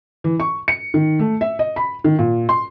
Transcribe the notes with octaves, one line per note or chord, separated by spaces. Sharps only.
E3
C#6
C#7
D#3
A3
E5
D#5
B5
D#3
A#2
C6